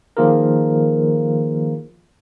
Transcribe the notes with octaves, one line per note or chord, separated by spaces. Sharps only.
D#3 F3 A#3 F4 G#4 A#4